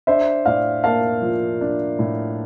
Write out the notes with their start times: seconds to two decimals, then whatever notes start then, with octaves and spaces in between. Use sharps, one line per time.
0.07 D4 C5 E5
0.46 A2 D5 F5
0.84 A#3 F5 A5
1.22 F3
1.61 D4
1.99 A2